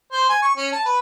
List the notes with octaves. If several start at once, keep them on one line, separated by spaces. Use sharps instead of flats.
C5
G#5
C#6
C#4
A5
B4